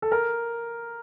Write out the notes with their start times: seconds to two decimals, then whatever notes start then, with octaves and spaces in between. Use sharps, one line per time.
0.02 A4
0.12 A#4